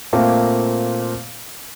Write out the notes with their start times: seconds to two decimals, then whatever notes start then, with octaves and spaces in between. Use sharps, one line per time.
0.13 A#2 A3 A#3 C4